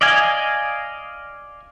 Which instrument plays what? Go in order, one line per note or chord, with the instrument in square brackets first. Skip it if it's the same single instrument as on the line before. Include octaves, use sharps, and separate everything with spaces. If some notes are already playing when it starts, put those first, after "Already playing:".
[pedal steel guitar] D5 D#5 F5 G#5